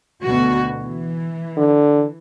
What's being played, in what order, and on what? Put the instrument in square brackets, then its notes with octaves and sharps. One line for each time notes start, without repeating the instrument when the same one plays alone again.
[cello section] D2 B2 F#4
E3
[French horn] D3